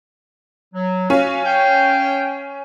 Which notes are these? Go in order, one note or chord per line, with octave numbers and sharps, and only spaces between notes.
F#3
C#4 F#4 F5
C#5 F5 G5